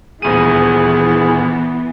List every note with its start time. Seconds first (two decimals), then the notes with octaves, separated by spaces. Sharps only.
0.22 D#1 D2 E3 B3 G#4 D#7